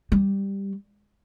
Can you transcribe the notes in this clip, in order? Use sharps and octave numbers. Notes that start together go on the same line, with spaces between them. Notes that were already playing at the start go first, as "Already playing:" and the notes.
G3